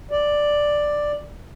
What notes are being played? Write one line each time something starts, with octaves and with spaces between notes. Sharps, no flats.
D5